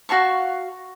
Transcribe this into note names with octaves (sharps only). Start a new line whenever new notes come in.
F#4 F5 A5 C#6